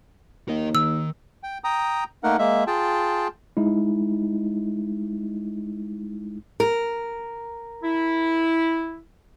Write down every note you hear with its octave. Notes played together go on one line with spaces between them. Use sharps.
D#2 A#4 D#5
D#3 E6
G5
G5 A#5 D#6
A3 A#3 D#4 A#4 F#5
G#3 A#3 E5
F4 G#4 G5 A5
G#3 D#4 E4
A#4
E4